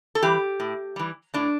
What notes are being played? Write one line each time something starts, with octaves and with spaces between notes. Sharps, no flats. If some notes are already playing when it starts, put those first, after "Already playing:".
A4
E3 G3 G4
A2
E3 G3
A2 D4